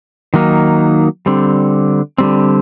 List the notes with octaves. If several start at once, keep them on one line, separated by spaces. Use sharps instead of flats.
D#3 F#3 A#3 D#4
D3 G3 C4
D3 G3 C4